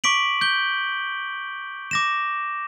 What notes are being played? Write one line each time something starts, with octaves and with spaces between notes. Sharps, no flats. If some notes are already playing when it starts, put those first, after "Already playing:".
C#6 D6 B6 D7 F#7
G6 G7
D6 A#6 E7